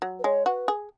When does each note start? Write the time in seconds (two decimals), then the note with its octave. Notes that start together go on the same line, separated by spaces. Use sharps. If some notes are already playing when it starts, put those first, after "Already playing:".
0.02 F#3
0.19 B4
0.24 G#3 C#5
0.46 F#4 B4
0.68 G#4